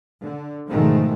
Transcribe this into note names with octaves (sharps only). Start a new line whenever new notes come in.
D3
G#2 B2 D#3 F3 G#3 A3